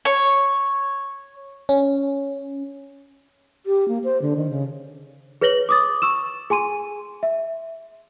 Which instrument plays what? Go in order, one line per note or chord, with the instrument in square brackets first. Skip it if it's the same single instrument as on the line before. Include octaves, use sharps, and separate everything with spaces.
[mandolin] C#5
[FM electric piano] C#4
[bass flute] G4
A#3
C5
D3
D#3
C#3
[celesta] G#4 B4 C#5 A#6 F#7 G7
D6 D#6 A6
C#6 E6 E7
G#4 G#5 C6 D#7
E5